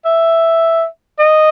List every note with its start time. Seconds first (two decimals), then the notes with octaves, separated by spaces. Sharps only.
0.05 E5
1.19 D#5